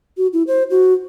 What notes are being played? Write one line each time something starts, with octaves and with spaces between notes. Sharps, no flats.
F#4
E4
C5
F#4